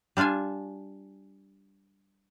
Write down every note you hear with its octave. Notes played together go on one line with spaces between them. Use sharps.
G3 D4 F4 F5 G#5